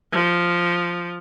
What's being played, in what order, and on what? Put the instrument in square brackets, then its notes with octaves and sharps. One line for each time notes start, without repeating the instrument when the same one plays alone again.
[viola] F3